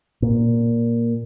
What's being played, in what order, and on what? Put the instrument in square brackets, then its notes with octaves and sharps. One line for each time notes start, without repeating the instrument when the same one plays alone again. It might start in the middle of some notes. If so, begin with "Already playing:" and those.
[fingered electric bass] A#2